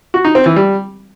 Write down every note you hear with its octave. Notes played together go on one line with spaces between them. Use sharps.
F#4
D#4
C4
E3
G3